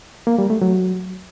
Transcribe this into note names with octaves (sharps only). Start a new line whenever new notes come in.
A#3
G3
A3
F#3